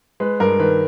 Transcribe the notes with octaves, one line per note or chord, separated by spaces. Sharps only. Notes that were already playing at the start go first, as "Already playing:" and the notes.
G#3 B4
G2 A#4
D#3 B4